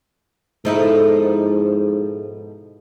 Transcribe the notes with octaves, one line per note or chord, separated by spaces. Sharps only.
G#2 B2 F3 D#4 E4 A4